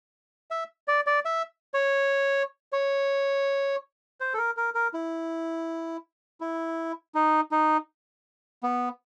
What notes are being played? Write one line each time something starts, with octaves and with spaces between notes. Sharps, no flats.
E5
D5
D5
E5
C#5
C#5
C5
A4
A#4
A#4
A#4
E4
E4
D#4
D#4
B3